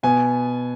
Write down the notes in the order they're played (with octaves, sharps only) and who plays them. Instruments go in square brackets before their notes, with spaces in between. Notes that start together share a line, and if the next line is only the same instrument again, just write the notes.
[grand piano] B2 B3 G#5